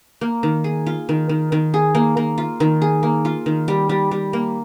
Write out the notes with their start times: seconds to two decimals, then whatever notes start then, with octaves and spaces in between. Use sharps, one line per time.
0.21 A#3
0.43 D#3
0.64 G#4
0.86 F4
1.09 D#3
1.29 D#3
1.52 D#3
1.74 G#4
1.95 A#3
2.17 A#3
2.38 F4
2.60 D#3
2.82 G#4
3.03 A#3
3.25 F4
3.46 D#3
3.68 G3
3.89 G3
4.11 G3
4.33 A#3